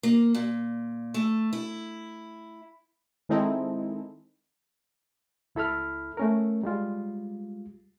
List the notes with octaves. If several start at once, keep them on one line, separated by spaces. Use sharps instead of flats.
A#3
A#2
A3
E4
D#3 G#3 C4 D#4 E4 A4
C#2 E4 A4 B5 F6
A3 C#4 A#4
G3 G#3 F4